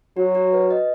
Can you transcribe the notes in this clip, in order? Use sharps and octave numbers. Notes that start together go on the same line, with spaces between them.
F#3 F#4
F#4
B4
D#5